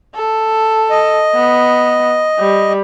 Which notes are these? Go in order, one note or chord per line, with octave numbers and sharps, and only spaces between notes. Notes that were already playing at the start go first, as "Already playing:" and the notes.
A4
D#5
B3
G3